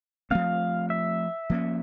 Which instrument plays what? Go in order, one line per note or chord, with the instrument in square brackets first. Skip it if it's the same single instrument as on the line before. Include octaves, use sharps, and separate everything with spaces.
[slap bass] F3 A3 C4 [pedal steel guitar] F5
[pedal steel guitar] E5
[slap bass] F3 A#3 C#4